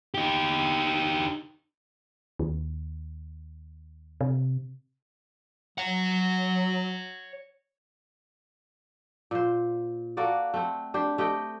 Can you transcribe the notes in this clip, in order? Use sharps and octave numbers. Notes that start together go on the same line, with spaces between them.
D#4 G4
D#2
C3
F#3 C#5 F#5
A#2 C5
A#3 F#4 A4 D5
A3 C4
D4 G4 C5
A3 G4 D#5 G5